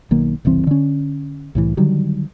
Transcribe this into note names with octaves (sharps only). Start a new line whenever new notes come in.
B1 D#3 A#3
F#1 C2 E3 C4
D3 C#4
C2 A2 E3
D3 D#3 F#3 G3